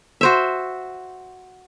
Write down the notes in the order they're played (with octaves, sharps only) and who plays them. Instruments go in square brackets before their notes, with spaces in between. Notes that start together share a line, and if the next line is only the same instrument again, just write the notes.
[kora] F#4 C5 E5